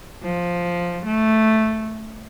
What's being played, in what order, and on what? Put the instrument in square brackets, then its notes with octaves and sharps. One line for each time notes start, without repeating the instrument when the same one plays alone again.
[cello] F3
A3